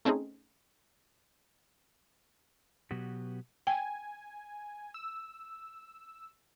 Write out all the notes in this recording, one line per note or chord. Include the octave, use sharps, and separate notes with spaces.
A3 C4 C#4 D#4 G#4
B2 F#3 B3 F#4 G4
G5 G#5
E6